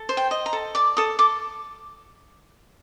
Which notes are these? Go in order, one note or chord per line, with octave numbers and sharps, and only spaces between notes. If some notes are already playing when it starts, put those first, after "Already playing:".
Already playing: A4
C5
G5
D#5
A#5
A4
D5 D6
A4 D#6
A4 D6